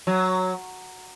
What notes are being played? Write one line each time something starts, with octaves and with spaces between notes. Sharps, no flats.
F#3